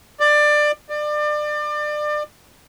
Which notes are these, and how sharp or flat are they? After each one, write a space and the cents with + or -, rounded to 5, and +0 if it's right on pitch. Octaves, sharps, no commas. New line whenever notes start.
D5 +20
D5 +30